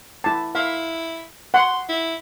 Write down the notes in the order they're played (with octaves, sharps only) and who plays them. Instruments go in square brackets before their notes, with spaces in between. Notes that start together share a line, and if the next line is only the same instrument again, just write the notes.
[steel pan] E4 A5
[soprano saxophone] E4 [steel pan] F5
[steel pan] F#5 [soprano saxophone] C6
[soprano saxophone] E4